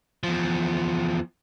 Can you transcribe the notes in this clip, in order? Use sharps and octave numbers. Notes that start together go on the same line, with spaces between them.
E2 F3